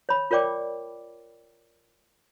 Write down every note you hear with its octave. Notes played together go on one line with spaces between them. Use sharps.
C#5 B5
F4 A#4 C#5 D5 G5 D6